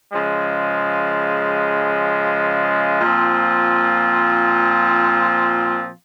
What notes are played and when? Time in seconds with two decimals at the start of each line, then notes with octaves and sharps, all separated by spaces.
0.12 C#3 F3 G#3
3.01 A#2 F3 C4